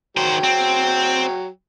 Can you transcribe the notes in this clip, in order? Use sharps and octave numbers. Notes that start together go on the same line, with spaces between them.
D#3 F#3 C5 G5
C4